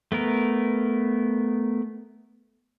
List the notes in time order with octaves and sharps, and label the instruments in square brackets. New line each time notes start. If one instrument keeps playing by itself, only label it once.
[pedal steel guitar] A3 B3 A#4